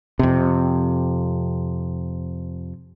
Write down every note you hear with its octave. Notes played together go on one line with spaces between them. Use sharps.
F2 C3